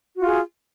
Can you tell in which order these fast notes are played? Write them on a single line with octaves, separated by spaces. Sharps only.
F#4 F4 G#4